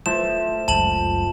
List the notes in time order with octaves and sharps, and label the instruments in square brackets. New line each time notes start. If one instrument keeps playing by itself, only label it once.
[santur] F3 [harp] A3 [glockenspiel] E7
[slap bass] F#1 C#2 F#2 [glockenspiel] A5 E7 F#7